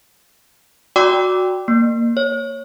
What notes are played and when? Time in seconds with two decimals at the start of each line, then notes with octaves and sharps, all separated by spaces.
0.96 F#4 D5 G5 C6 D6 E6
1.68 A#3
2.17 C#5